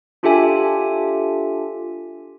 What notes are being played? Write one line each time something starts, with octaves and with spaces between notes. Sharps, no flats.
D4 F4 G4 A4 E5 G#5